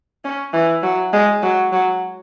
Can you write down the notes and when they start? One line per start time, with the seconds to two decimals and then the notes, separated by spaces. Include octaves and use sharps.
0.24 C#4
0.53 E3
0.83 F#3
1.13 G#3
1.42 F#3
1.72 F#3